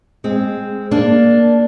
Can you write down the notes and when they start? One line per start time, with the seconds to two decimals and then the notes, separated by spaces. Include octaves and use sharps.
0.24 G#3 C4
0.91 A#3 D4